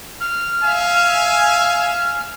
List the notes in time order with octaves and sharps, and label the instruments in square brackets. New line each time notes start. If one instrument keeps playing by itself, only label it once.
[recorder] F6
[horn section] E5 F5 G#5